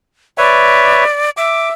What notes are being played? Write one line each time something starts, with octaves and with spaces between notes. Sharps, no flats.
B4 C#5 D5 E5
E5 D6